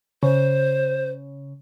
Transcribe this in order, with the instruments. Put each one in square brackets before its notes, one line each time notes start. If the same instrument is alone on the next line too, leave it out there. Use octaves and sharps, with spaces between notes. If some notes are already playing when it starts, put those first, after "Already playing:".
[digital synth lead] C#3 [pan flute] C5